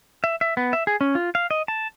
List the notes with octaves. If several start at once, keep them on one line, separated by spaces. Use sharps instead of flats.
E5
E5
B3
E5
G#4
C#4
F4
F5
D#5
A5